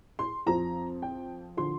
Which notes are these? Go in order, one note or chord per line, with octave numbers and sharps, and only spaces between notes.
C6
F2 F3 C4 A#5
G5
D3 F3 C6